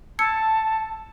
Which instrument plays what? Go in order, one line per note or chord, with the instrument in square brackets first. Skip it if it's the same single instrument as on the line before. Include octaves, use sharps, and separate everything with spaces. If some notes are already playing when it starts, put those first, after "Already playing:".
[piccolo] A5 [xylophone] E6 G#6 C#7